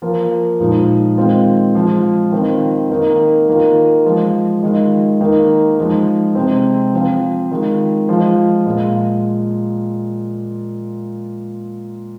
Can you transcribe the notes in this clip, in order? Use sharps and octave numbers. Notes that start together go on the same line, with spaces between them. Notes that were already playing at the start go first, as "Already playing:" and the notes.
F3 A#3 F4
A#2 F3 G#3 D#4
D#3 G#3 C4 F4
F3 G#3 F4
D#3 C4 F4
D#3 A#3 D#4
D#3 A#3 F4
F3 G#3 F4
D#3 G#3 F4
D#3 A#3 D#4
F3 G#3 D#4
C3 G#3 C4
F3 C4 F4
D#3 G#3 F4
F3 G#3 F4
A#2 G#3 F4